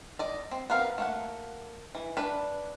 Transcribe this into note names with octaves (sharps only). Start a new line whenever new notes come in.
D5 D#5
C4
B3 C4 F#4 A#4 F5
A3 A#3 F#5
E3
D4 B4